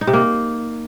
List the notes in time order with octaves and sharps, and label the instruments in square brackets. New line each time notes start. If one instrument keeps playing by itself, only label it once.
[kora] D#4
C3
A#3